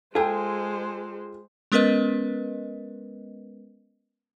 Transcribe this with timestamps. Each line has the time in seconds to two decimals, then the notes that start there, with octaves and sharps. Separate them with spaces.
0.15 G#3 F4 G#4 A4 C5 G5
1.72 G#3 B3 C#4 A#4 B4 D#5